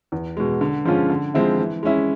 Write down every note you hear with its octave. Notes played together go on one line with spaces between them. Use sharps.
E2
B2 G#3
D3
F3 G#3 C#4 F4
D3
F3 G#3 C4 E4
E3
G#3 C#4 E4